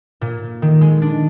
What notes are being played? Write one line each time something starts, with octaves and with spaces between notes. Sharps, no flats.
A#2
D#3
G#3
D4